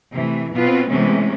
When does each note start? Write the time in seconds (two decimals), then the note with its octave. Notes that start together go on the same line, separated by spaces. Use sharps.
0.13 C3 E3 A3
0.54 B2 B3 C4 F4 B4
0.90 C3 E3 G#3 A3 B3 C#4